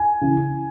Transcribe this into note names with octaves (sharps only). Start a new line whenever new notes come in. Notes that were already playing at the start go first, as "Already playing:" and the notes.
Already playing: G#5
C#3 E3